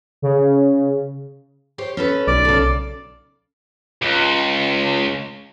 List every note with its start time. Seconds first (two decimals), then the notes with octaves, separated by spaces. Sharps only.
0.22 C#3
1.78 G4 C5 C#5
1.97 C#4 A4 B4
2.27 B1 D5
2.45 C#3 A4
4.02 C#2